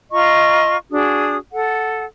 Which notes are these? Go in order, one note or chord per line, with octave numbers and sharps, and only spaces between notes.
F4 D#5 A#5 C#6
D4 F#4 G#4 D#6
A4 F#5